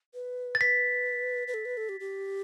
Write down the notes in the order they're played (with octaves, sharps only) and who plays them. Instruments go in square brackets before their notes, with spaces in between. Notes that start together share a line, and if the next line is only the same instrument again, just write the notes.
[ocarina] B4
[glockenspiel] A6
[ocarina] B4 [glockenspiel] B6
[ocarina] B4
A4
B4
A4
G4
G4